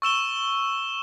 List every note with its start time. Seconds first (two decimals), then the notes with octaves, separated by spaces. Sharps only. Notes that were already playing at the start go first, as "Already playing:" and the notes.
0.02 C#6 E6 E7 G7